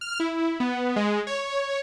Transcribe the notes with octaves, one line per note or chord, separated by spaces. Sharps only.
F6
E4
B3
G#3
C#5